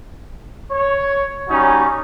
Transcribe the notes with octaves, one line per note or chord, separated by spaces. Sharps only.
C#5
G3 C#4 D#4 F#4